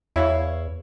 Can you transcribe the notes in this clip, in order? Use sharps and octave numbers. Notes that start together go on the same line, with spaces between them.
E2 E4 C#5 F5